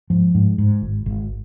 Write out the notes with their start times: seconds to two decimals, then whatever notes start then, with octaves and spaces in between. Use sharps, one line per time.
0.10 G#2 F3
0.35 G#2
0.58 G#2
0.82 G#1
1.06 G#1